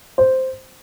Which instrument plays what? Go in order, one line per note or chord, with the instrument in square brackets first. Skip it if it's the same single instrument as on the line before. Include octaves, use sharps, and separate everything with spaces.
[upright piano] C5